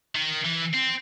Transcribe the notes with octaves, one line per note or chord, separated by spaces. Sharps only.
D#3
E3
C4